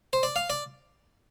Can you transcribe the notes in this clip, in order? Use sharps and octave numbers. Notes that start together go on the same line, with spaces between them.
C5
D5
F5
D5